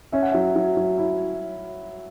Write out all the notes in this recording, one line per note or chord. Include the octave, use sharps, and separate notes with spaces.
C#4 E5
F#5
F#3 E5
F#3
F#3
E4